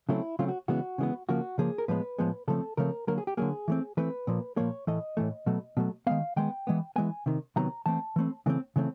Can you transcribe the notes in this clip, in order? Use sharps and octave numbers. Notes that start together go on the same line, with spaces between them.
C#3 F#3 A3 C4 E4
C#3 F#3 A3 C4 F4
F#4
C#3 E3 G#3 B3 F#4
C#3 E3 G#3 B3
C#3 F3 A#3 F#4
C#3 F3 A#3 G#4
A#4
A2 F3 G#3 B3 B4
A2 F3 G#3 B3
C#3 F3 A3 C4 A4
C#3 F3 A3 C4 A#4
D3 F#3 A#3 A#4
G#4
G4
D3 F#3 A#3 G#4
E3 A3 C4
E3 A3 C4 B4
A#2 F3 A#3
A#2 F3 A#3 C#5
A2 E3 A3 D#5
A2 E3 A3
B2 F#3 A3
B2 F#3 A3
D#3 G#3 B3 F5
D#3 G#3 B3 G5
E3 G#3 B3
E3 G#3 B3 G#5
C3 D#3
C3 D#3 F#3 B3 A#5
E3 A3 C4 A5
E3 A3 C4
C#3 E3 A3 C4
C#3 E3 A3 C4